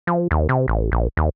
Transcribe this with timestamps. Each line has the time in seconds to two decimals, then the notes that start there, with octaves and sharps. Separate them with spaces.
0.07 F3
0.31 D#2
0.49 C3
0.68 A1
0.92 A#1
1.17 D#2